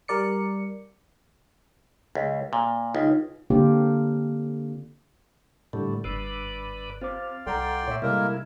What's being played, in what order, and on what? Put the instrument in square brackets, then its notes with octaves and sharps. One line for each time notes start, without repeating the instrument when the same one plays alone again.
[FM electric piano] G3 A#4 D5 C#7
[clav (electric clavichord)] C#2
A#2
[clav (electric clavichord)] C#2 [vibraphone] D#4 F4
[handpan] D3 A#3 C4 D4 F4 G4
[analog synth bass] A2 [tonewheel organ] D3 G3 A3
[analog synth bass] G1 [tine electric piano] G2 E6 C7 [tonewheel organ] B4 D5
[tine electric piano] C4 C5 D6 [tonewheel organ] F4
[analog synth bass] C2 [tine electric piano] A4 F#5 A#5 [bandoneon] D5 G5 C6
[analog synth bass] A#2 [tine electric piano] C#5 E5
[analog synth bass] C3 [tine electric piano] G3 C4 A4 [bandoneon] G#3 A#3 A#4 [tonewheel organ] E4